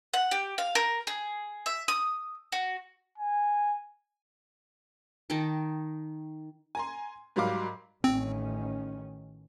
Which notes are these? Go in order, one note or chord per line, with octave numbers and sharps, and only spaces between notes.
F#5
G4
F5
A#4
G#4
E5
D#6
F#4
G#5
D#3 D#4 G5 A5
G#5 A#5 C6
G#2 F#3 G3 A#4 F5 D6
A1 D#3 C4 C#4